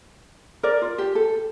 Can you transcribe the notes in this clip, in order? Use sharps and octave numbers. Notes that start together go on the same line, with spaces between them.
A#4 D5
F4
G4
A4